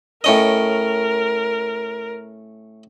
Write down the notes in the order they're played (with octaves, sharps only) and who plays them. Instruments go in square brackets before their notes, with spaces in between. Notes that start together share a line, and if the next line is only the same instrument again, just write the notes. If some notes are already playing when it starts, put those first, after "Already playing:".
[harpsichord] A2 C#4 D#5 [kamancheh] A#4